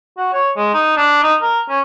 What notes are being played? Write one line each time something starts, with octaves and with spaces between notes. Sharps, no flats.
F#4
C#5
G#3
D#4
D4
D#4
A#4
C#4